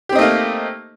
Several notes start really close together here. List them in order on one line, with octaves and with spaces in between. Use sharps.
G4 C4 D#4 A3 A#3